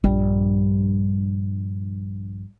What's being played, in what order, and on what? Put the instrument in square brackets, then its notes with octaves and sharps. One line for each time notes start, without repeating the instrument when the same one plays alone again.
[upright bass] A#1 G2 [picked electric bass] G3